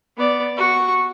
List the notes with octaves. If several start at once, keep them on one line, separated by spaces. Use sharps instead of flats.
B3 D5
F#4 C#6